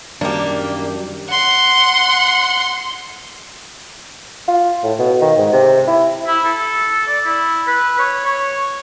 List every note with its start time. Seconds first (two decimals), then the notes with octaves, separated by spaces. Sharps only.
0.21 F#2 D#3 F#3 G3 A#3 D4 G4
1.29 F#5 C6
4.48 F4
4.83 A2
4.99 B2
5.22 D#3
5.38 G#2
5.53 C3
5.87 E4
6.27 E4
6.45 A4
7.07 D5
7.26 E4
7.67 B4
7.99 C#5
8.25 C#5